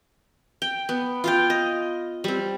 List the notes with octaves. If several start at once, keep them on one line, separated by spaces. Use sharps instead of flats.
G5
B3
F4 F5 G5
D#5
G3 C4